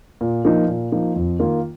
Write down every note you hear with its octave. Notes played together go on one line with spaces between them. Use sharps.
A#2
F3 A#3 D#4
A#2
F3 A#3 D#4
F2
D#3 A#3 F4